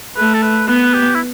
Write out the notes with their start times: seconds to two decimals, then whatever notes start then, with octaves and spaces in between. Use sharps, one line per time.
0.17 A3 B4
0.34 A4
0.42 B4
0.68 B3 B4
0.93 G4
1.15 E4